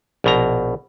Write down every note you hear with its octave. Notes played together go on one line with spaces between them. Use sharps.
A#1 B2 A#5